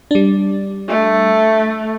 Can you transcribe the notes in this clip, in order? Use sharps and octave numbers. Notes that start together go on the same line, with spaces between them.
G3 D4
A3